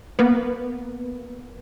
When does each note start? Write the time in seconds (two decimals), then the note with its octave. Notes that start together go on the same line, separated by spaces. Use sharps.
0.19 A#3 B3